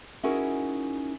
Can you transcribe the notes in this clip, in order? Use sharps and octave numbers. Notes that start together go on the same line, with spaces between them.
C#4 D#4 E4 F#4 G#4 A#4